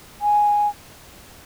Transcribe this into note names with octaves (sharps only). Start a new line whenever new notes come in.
G#5